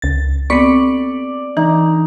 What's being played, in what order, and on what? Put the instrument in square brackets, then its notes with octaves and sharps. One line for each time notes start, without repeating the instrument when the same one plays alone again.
[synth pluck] C#2 A6
[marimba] B3 C4 [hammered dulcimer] D5 [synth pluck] C#6 B6 C#7
[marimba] E3 [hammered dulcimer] D#4